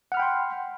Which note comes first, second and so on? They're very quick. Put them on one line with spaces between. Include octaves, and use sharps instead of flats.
F#5 F6 B5 G5 C6